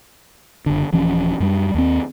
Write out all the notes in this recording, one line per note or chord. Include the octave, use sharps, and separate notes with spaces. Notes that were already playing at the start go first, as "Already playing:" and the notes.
F#1 D3
D#1 E3 F3 C#4
F#2 G3
D#2 C4